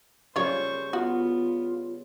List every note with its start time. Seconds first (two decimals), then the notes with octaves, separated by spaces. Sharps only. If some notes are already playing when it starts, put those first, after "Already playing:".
0.36 C#3 G3 F4 C5 C#5 C#6
0.93 B3 F4 F#4